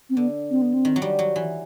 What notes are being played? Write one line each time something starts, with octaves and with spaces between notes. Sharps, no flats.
C4
D3 B3
C4
B3
C4
D#3
F#3
G3
F#3
E3